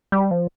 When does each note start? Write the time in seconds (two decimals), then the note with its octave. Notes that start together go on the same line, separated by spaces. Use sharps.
0.12 G3
0.31 F3